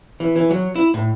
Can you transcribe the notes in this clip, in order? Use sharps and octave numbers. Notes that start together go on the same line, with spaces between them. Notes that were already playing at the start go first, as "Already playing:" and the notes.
E3
E3
F#3
E4
A2